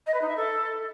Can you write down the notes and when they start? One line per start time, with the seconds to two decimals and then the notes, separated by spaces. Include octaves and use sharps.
0.06 D#5
0.14 B4
0.21 D#4
0.29 E5
0.36 A4